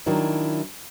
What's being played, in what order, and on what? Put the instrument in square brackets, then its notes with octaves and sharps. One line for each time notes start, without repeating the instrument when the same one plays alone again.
[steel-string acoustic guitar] D#3 F#3 D4 E4